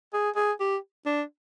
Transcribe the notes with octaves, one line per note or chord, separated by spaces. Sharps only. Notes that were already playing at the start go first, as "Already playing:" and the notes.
G#4
G#4
G4
D4